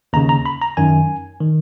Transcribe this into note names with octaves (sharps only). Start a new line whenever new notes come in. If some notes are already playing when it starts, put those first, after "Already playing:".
D#2 C#3 A#5
A#5
B5
A#5
F#2 D#3 G#5
D#3